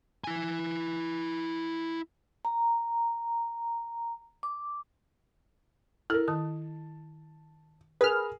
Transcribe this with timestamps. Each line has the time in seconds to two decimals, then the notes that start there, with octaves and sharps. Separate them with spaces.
0.24 E4 G#5
2.45 A#5
4.43 D6
6.10 E4 A4 A#4 F6
6.28 D#3 A5 D#6
8.01 G#4 A#4 B4 F6